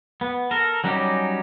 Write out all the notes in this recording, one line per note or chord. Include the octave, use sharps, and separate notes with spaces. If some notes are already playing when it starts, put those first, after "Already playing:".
B3
A4 A#4
F#3 G3 C#4 D#4 G4